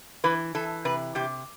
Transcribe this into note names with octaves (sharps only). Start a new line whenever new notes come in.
E3 B4
E3 A4
C3 B4
C3 G4